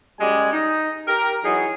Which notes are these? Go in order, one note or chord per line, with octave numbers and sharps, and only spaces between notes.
F#2 G3 G#3 D5 G#5
D#4
G4 A#4
E3 F#3 D#4 G#4